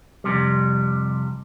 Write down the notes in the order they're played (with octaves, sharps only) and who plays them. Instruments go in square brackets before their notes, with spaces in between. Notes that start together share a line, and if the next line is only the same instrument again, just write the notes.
[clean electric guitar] F2 A2 C3 G3